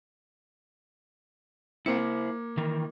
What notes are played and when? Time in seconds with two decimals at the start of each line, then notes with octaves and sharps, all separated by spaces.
1.86 A#3 C4 E4 C5 C#7
1.98 A#3
2.57 D#3 E3 A#4